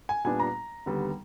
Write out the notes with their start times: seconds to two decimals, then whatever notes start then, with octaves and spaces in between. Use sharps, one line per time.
0.09 G#5
0.24 A#2 G3 B3 D4 G#5
0.40 A#5
0.86 D#2 D3 G3 B3